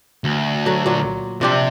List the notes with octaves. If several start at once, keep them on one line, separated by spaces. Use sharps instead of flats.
D2
F#3 A3
A#2 F#3
C3 F3 D4 G4 C5